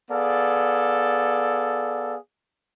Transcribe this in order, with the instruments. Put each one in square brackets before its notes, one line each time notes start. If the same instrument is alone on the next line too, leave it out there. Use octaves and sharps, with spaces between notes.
[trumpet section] B3 G#4 A4 D5 F5